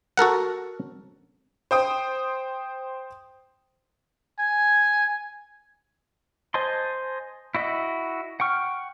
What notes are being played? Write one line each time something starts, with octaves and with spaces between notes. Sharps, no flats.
F#4 A4 A#4 F#5
C5 G5 D#6
G#5
C5 D#5 G#5 A5 C6
E4 F#4 D#5 E5
F#5 G5 C#6 F6